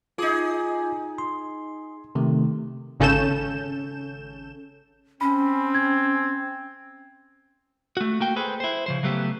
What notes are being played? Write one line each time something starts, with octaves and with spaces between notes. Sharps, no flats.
D#4 F4 G#4 D6
C6
C3 D#3 A3
G#1 C#3 C#4 A4 G6 E7
C4 C#4 B5
G#6
A3 F#4
A#3 F#4 G5
G#4 A4 B4 C5
E4 C5
C#3 F3 C5
C#3 F#3 A3 B3 G4